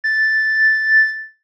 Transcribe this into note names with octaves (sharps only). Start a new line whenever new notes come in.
A6